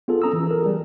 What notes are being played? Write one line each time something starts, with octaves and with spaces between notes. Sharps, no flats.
B3 F4 G#4 A4
C#4 A4 A#5 D#6 E6
E3
A4 A#4
G3 G#4